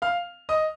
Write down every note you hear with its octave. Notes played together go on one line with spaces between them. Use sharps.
F5 F6
D#5 D#6